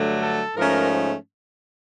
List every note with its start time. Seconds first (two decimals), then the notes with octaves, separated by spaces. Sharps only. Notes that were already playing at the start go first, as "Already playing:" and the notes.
Already playing: G2 D3 F#3 A3
0.21 A4
0.56 G#2 F3 A3 C#4 A#4